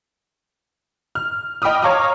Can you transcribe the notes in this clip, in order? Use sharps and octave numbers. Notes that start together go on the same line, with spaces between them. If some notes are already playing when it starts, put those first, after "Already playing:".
F6
D#5 G5 B5 D6 D#6 F6
C#5 F5 A#5 D6 D#6 F6